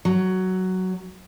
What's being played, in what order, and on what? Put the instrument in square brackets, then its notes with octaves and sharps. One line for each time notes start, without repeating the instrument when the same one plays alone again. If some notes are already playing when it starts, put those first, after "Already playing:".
[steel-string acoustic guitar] F#3